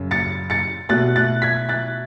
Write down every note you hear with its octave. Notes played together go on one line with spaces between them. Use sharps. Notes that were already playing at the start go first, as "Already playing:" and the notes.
Already playing: F#2 C#3
A6 C#7
A6 C#7
B2 A3 F#6 A6
F#6 A6
G#6 B6
F#6 A6